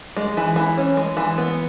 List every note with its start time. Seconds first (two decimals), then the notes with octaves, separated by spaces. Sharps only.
0.17 G#3
0.37 E3
0.56 E3
0.77 C#4
0.97 G#3
1.17 E3
1.38 B3